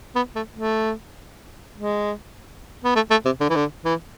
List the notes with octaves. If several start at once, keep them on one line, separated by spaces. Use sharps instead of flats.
B3
A3
A3
G#3
B3
A3
A3
C3
D3
E3
D3
E3